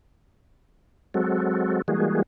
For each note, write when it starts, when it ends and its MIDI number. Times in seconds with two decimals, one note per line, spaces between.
1.14 1.82 54
1.14 1.82 56
1.14 1.82 60
1.14 1.82 66
1.14 1.82 69
1.88 2.22 52
1.88 2.22 55
1.88 2.22 56
1.88 2.22 58
1.88 2.22 66
1.88 2.22 68